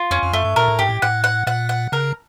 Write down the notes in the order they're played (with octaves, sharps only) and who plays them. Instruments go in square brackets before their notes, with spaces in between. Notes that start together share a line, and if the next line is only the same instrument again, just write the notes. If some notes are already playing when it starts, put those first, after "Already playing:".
Already playing: [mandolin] F4
[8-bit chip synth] F2 [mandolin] C#4
[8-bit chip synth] F2
[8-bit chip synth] F#2 [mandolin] A3
[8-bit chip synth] G2
[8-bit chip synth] A#2 [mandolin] A#4
[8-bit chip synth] A2
[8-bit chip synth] G#2 [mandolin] G4
[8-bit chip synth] A2
[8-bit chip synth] A2 [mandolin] F#5
[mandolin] F#5
[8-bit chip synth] A#2 [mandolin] F#5
[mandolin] F#5
[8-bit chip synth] C#3 [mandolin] A#4